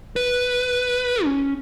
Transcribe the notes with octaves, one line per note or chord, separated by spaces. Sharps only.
B4
C#4